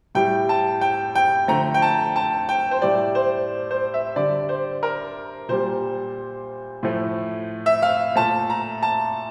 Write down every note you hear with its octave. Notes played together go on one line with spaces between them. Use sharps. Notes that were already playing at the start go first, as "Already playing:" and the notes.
A2 G3 G5
A5
G5
G5
D3 F3 A3 A#5
G5
A5
A5
G5
C5
A2 G3 D5
C5
C5
E5
D3 G3 D5
C5
A#4
A#2 G3 C5
A2 F3 A3
E5
F5
A#2 A3 A5
A#5
A5